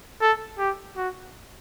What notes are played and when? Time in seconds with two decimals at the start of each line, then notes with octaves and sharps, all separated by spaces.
0.21 A4
0.59 G4
0.97 F#4